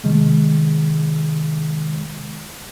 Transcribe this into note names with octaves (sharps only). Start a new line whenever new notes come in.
C3 D#3 G#3